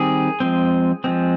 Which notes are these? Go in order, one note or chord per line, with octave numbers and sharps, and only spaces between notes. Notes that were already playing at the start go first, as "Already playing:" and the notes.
Already playing: D#3 G3 C4 G#4
F3 G#3 C4
F3 G#3 C4